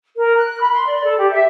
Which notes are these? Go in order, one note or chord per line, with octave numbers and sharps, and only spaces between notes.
A#4
F#6
B5
C6
D5
A4
G4
E5